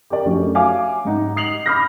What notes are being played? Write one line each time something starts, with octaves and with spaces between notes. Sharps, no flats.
G4 A#4 D5
F#2 F3 A3 C#4 D4
F#4 C#5 E5 F5 G#5 D6
G#2 D#4 F#5
D#6 C7 F7 F#7
B5 D6 D#6 F6 G6 A#6